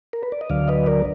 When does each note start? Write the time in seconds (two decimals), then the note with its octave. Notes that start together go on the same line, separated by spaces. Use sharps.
0.13 A#4
0.23 B4
0.32 D5
0.41 D#5
0.50 D2 D3 F#3 D5 F5
0.68 B4 D#5
0.86 A#4 D5